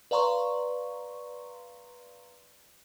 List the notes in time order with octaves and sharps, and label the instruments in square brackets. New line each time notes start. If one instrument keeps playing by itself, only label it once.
[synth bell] B4 D5 F5 A#5 C6 C#6